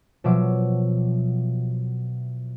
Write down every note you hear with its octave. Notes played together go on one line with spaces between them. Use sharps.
B2 F3 F#3 E5 D6